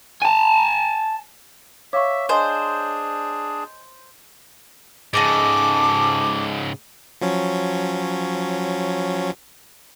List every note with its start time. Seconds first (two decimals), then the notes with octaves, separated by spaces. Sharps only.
0.22 G#5 A5
1.93 C#5 E5 F5 C#6 D6
2.29 D4 G#4 C5 D#5 G#5
5.13 G#2 C#3 G#4 A4 D#5 D6
7.21 F3 F#3 C#4